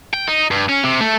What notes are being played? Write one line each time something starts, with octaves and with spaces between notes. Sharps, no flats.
G5
D#4
G2
C#4
C3
A3